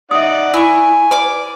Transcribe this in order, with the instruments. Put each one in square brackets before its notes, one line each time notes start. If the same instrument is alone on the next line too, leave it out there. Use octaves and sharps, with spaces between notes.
[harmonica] D#4 D5 F#5 [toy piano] E5 D#6
[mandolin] E4 C#6 [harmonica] G#5
[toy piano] B4 [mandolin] D5 D6